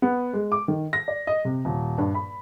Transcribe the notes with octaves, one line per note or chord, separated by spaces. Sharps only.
B3
G#3
D6
D#3
A#6
D5
D#5
C3
D#1
G2
B5